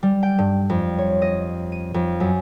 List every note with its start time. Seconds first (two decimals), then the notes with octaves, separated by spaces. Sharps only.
0.03 G3
0.23 G5
0.38 G2
0.70 F2
0.98 C#5
1.22 D#5
1.72 D#7
1.94 F2
2.20 F#2